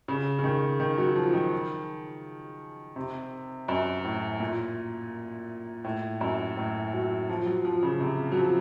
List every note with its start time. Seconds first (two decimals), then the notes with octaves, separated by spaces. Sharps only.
0.08 C#3
0.39 C#3
0.44 D#3
0.80 D#3
0.98 F#3
1.16 F3
1.34 D#3
2.96 C3
3.68 F#2
4.04 A2
4.40 A#2
5.84 A2
6.21 F#2
6.57 A2
6.93 F#3
7.29 F3
7.46 F#3
7.65 F3
7.83 C#3
8.01 C3
8.32 F#3
8.37 F3